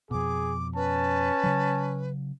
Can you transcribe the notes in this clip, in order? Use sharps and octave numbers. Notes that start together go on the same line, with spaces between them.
F2 B2 G#4 D6
C#4 B4 A5
C#3 F#3